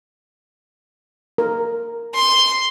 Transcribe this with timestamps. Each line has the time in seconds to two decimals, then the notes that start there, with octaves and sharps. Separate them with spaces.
1.38 A#4
2.15 C6